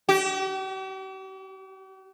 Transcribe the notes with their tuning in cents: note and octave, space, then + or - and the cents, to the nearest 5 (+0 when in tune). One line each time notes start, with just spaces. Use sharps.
G4 -45